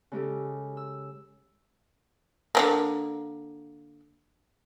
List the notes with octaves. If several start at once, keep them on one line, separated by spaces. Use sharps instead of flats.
C#3 G#3 G4 A4
E6
D3 F#3 A#3